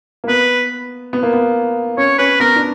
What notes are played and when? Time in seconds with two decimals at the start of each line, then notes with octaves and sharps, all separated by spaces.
0.24 A#3
0.28 B3 B4
1.13 B3
1.23 A#3
1.33 B3
1.98 C#4 C#5
2.18 C#4 B4
2.40 B3 A#4
2.56 D4